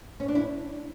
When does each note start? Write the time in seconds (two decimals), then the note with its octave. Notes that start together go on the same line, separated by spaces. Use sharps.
0.20 C#4
0.28 D4
0.35 E4